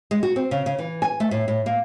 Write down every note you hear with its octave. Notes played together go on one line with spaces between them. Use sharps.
G#3
F#4
C4
C#3
C#3
E3
G#5
A3
A2
A2
A#3